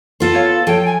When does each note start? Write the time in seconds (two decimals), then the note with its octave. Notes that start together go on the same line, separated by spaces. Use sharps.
0.20 B3 F4 A4 C5
0.35 C#5 F5
0.67 F3 A4 C#5 G5
0.85 G#5